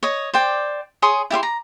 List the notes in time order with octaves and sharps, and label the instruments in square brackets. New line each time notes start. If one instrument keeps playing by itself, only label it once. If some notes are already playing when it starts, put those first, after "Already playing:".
[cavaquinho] C#5 D#5
C5 D5 G5
G#4 C#5 C6 D#6
E4 G4 E5 C6
A#5